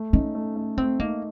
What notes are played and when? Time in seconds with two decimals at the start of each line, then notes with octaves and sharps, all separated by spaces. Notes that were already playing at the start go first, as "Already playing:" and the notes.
Already playing: A3
0.13 C#4 D#4
0.35 A3
0.56 A3
0.78 A3 C4
0.99 A#3 D#4